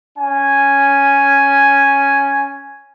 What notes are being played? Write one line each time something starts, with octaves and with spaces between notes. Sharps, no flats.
C#4 G#5